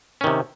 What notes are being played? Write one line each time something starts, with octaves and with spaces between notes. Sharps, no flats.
C3 D#3 C#4